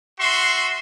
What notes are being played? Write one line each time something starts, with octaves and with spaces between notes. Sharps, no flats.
F#4 E5 C6